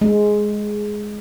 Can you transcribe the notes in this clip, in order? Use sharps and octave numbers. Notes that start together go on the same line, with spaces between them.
G#3